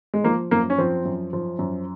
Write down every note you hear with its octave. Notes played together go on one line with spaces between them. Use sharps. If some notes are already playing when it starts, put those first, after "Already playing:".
G#3
F3 A#3
F#2 A#3
C#4
F3 C4
F#2
F3
F#2